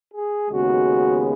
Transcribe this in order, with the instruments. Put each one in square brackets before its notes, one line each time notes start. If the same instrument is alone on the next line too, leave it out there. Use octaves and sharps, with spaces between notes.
[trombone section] G#4
D#2 C#3 G#3 B3 F#4